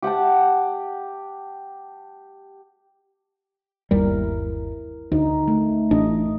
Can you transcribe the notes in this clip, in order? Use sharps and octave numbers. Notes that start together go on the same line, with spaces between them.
G4 F#5 G5 A5
G1 D#2 G3 E4 A#4
D2 D#4
A3
A1 D4 D#5